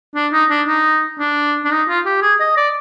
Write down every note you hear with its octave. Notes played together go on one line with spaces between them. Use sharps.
D4
D#4
D4
D#4
D4
D4
D#4
F4
G4
G#4
D#5
D5